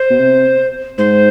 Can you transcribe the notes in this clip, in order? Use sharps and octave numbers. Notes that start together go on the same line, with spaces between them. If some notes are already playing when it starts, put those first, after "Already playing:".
Already playing: C5
B2
C3
G#2 C5